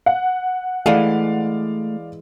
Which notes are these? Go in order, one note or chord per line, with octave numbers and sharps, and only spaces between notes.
F#5
E3 G#3 A3 D5 F5